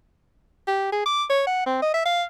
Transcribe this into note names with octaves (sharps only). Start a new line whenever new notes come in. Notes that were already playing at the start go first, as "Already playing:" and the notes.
G4
G#4
D6
C#5
F#5
C4
D#5
E5
F5